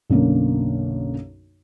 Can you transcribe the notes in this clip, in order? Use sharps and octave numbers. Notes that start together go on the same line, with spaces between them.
B1 F#2 D3 A#3